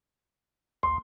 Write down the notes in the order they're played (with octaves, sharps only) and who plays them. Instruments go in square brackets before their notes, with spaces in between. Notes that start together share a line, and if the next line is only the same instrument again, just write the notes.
[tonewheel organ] A#1 D#2 [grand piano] C6